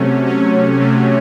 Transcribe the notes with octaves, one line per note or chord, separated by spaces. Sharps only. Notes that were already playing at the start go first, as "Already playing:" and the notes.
Already playing: C3 F#3 A3 C#4
C#4
C3 F#3 A3